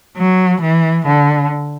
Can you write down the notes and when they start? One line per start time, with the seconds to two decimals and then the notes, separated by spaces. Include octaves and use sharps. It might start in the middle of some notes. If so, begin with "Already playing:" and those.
0.17 F#3
0.62 E3
1.06 D3